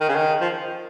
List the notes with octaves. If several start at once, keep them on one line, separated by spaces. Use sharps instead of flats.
D#3
C#3
D#3
F3